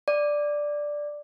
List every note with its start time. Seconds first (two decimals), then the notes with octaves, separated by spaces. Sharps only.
0.08 D5